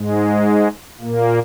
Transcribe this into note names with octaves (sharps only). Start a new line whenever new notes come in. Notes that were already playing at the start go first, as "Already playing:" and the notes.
Already playing: G#2 G#3
A#2 A#3